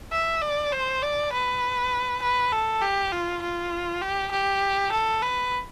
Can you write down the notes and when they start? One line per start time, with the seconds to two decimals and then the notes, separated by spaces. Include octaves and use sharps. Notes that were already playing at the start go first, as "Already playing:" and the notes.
0.12 E5
0.42 D5
0.72 C5
1.02 D5
1.33 B4
2.22 B4
2.52 A4
2.82 G4
3.12 F4
3.42 F4
4.01 G4
4.31 G4
4.92 A4
5.22 B4